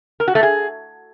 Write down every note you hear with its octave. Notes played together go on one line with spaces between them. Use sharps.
A#4
F#4
A3
G#4